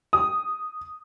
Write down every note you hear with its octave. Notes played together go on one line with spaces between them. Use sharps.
D#6